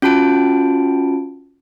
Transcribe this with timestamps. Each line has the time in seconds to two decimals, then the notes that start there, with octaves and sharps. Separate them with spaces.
0.02 C#4 F4 F#4 A5 D7